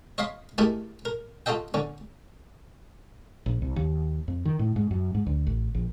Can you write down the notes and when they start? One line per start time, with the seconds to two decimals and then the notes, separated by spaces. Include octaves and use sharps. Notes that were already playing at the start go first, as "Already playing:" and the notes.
0.18 C#5 D#5 F5 B5 C6
0.58 A3 D#4 E4 G4 G#4 A#4
1.05 A#4
1.46 F4 F#4 A4 D#5 G5
1.74 D3 C#4
3.46 A#1
3.62 C2
3.76 D#2
4.28 F2
4.45 D#3
4.59 A2
4.76 G#2
4.91 F#2
5.15 G#2
5.27 D2
5.47 A1
5.75 A#1